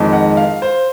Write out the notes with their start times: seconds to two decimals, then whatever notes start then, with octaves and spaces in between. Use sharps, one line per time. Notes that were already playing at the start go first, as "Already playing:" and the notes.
Already playing: F2 D#3 G#3
0.13 F#5
0.37 F5
0.62 C5